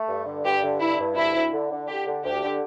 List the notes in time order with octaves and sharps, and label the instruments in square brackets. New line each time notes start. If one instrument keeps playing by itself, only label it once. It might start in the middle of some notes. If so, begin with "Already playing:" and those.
Already playing: [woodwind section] A3
G2
D3
[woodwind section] G2 [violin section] G4
[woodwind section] D3
[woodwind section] G2 [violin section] E4
[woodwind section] G2
[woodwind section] D2 [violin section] E4
[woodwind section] D2
D3
D3
[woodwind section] D3 [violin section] G4
[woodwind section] D3
[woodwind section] D2 [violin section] G4
[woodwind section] D3